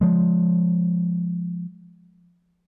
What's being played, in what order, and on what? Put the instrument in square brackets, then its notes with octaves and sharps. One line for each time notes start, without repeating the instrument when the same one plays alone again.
[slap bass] F3 G#3